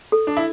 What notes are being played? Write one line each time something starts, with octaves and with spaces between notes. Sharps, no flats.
A4
D4
E4